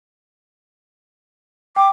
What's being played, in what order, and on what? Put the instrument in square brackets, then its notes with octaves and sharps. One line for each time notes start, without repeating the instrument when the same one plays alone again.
[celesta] G5 [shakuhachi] D6